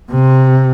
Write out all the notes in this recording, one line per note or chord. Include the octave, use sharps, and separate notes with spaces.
C3